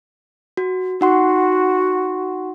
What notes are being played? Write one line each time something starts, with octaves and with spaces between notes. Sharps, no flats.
F#4
D#4 F#4 F#5 C6